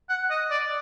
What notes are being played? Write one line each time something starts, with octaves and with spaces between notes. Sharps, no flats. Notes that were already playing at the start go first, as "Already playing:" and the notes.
F#5
D#5
D5